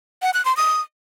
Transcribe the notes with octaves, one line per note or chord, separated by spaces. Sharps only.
F#5
F#6
C6
D#6